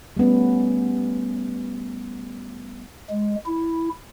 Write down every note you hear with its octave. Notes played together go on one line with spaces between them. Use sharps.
G3 A3 B3 C#4
G#3
E4